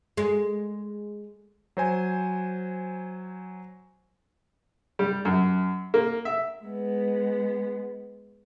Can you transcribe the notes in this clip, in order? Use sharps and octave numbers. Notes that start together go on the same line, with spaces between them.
G#3
F#3 C5 G#5
G3
F#2
A#3
E5
G#3 B3